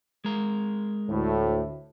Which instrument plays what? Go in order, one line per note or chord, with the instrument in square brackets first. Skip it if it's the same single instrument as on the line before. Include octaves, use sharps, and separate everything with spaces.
[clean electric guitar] G#3 A#4
[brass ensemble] D2 A2